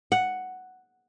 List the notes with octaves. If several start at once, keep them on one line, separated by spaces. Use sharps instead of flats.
F#5